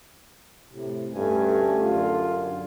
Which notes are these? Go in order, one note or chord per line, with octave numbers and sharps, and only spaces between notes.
A2 C3
D2 G2 A3 C#4 G4 A4 G#5
F#2 D3 F4